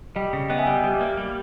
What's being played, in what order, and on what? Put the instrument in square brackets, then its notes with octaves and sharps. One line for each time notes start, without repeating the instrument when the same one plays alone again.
[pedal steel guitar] G3 [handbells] D#5 G5
[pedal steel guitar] C#3
[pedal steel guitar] B3 [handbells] D#5 G5
[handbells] E5 G#5
[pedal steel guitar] G3 [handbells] D#5 G5
[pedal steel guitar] G3 [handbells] G4
[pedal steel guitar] A#3
G3